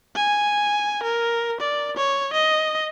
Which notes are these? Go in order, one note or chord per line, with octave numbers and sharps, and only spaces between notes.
G#5
A#4
D5
C#5
D#5